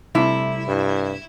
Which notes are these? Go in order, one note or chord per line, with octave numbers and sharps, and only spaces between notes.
C3 G3 A3 E4
G2